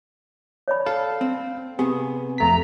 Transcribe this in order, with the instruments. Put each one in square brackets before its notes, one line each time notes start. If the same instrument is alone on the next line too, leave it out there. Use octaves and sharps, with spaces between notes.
[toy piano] C#5 D5 B5
[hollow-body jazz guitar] A4 [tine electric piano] F5
[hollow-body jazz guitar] C4
[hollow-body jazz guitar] C3 B3 [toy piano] G4 [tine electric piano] G#4
[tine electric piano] F2 A3 B6 [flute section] A#5